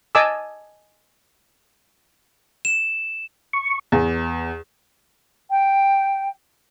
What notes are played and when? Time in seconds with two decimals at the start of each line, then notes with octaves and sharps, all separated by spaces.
0.15 D#5 G#5 A5 D6 E6
2.65 E7
3.53 C#6
3.92 E2
5.50 G5